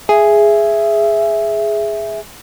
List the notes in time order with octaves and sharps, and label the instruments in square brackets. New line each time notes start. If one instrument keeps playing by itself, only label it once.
[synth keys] G#4 [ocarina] E5